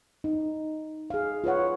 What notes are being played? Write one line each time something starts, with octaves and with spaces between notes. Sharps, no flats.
D#4
G#4 F5
F4 B4 C#5 F#5